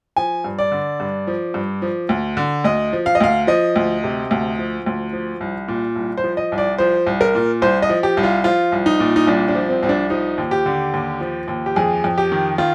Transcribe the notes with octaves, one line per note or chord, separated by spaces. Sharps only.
F3 G#5
G2
D5
D3
G2
F3
G2
F3
D2
D3
D2 D#5
F3
F5
D#5
D2 F5
F3 D#5
D2
C3
D2
F3
D2
F3
C2
A#2
C2
C5
F3
D#5
C2
D5
F3 C5
C2
A#4
A#2
C2 C5
D#5
F3
G4
C2
F4
F3 F4
C2
D#4
A#2
D#4
C2 D4
D4
F3
C4
C2 C4
D4
F3 D#4
D#2
G4
D3
D#2
F3
D#2
G4
F2 G#4
F2
G4
D#3
D#3 F4